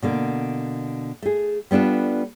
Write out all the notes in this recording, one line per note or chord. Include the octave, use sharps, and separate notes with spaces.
B2 D3 A#3
A3 G#4
G3 B3 D4 F4 A4